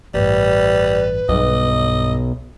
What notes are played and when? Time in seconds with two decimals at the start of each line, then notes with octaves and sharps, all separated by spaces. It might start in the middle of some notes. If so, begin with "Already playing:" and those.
0.14 A1 G2 G3 B4
1.29 B1 G2 D#5